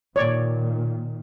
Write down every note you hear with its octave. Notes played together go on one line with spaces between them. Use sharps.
A#2 D#3 C#5 D5